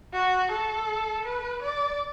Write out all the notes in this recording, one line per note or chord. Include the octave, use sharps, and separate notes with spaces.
F#4
A4
B4
D5